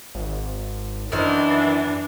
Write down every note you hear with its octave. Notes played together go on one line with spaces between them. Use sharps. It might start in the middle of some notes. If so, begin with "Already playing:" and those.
G#1
F#2 D#3 E3 D4 E4 C5